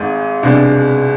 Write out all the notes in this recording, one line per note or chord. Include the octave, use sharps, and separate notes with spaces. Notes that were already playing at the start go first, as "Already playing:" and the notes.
Already playing: G#1 G#2 G#3
C2 B2 G#3 D4